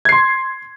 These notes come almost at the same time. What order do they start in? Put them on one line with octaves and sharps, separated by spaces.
G#6 C7 C6